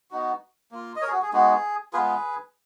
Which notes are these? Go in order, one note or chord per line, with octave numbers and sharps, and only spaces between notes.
B3 D#4 F#4
A#3 F4
D#5
A#4 C#5
G#4
F#4
G#4
G#3 B3 D#4 F#4 G#4
G#3 B3 F4 G#4 B4